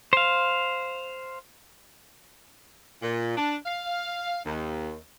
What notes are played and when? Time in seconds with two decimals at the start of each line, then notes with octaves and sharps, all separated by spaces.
0.13 C5 F5
3.02 A#2
3.37 D4
3.66 F5
4.45 D#2